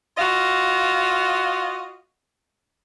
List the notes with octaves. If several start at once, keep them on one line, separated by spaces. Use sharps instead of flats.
F4 F#4 D#5 F5